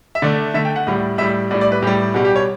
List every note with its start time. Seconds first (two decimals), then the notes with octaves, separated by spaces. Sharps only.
0.15 E5
0.22 D3 A3 D5
0.54 D3 A3 E5
0.65 G5
0.76 F#5
0.87 A2 G3
1.18 A2 G3 E5
1.51 A2 G3 D5
1.61 D5
1.72 B4
1.82 A2 G4
1.87 G3
2.14 B2 G3 F#4
2.25 G4
2.36 C#5